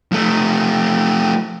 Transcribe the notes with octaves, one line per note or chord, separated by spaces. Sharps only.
F3 A3